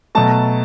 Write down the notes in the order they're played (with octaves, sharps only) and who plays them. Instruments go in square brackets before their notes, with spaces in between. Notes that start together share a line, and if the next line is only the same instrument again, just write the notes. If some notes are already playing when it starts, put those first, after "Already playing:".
[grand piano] B2 F#3 A3 A5